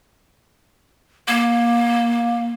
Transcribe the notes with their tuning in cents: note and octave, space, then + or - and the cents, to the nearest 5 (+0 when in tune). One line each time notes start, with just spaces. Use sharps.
A#3 +20